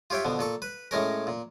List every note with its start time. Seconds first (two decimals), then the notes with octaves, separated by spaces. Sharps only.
0.10 F4 G4 C#5 E5 G5
0.25 B2 D3 F3
0.39 A#2 A4 C#6
0.62 B4
0.91 A2 G#3 C#4 A#4
1.27 A#2